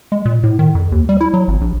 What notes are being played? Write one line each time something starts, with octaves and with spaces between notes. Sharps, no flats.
G#3
A#2
A2
D#3
F2
D#2
G3
E4
F#3
G#1
A#1